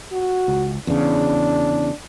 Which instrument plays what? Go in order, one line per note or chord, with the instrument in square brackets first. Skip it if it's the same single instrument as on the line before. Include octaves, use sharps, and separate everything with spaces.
[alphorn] F#4
[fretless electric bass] C#2
[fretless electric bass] E2 C#3 [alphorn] D4